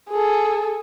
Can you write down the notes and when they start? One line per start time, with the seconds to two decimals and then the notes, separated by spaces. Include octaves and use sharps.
0.10 G#4 A4